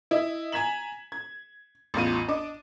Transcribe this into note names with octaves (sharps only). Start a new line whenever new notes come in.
E4 D#5
G#5 A#5 G#6 B6 E7 F#7
G#6
A1 E2 F4 D#7
D4 D#5 D6